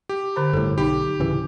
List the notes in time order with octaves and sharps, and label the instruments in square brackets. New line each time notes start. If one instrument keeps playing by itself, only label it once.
[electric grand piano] G4
[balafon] D3 C5 A#5
[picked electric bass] G1 A2 [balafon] A4
[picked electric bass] B1 [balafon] D#4 B5 [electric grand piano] G4
[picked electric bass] D1 C#3 E3